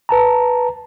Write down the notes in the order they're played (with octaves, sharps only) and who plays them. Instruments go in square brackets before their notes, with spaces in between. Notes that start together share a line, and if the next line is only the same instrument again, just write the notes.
[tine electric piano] B4 A5 A#5